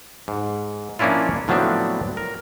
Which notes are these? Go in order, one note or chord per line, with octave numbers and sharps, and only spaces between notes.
G#2
F3 A#3 C#4 D4 E4 F4
A2 F3 F#3 B3 C4 D4
A#4